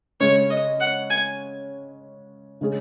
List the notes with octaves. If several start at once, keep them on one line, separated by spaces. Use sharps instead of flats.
C#3 G#3 C#4 C#5
D#5
F#5
G#5
C#3 G#3 C#4 G#4